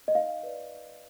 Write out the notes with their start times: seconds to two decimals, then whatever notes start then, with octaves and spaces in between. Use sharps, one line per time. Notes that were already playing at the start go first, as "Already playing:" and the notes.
0.08 D#5
0.15 D#4 F5
0.43 B4 D5